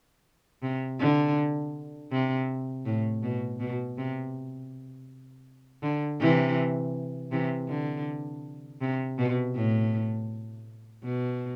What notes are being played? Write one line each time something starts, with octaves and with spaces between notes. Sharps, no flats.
C3
D3
C3
A2
B2
B2
C3
D3
C3 E3
C3 E3
D3
C3
B2
A2
B2